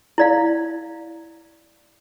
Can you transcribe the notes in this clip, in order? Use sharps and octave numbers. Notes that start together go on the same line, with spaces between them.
E4 D5 F5